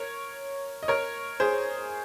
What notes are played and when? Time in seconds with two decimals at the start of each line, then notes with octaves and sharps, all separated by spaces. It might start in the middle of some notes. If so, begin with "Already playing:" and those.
Already playing: A#4 C#5
0.83 D#5
0.88 A#4 C#5
1.40 G#4 C5